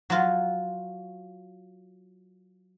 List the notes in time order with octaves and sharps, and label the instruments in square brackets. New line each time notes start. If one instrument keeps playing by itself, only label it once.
[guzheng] F#3 F4